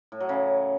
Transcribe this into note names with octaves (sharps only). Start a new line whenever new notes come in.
A2
F#3
C#3